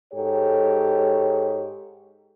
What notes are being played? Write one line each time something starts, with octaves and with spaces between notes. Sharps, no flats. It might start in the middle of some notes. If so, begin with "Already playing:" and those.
G#2 G4 A4 C#5